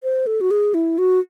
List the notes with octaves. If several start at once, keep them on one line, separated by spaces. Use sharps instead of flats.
C5
A4
F#4
G#4
E4
F#4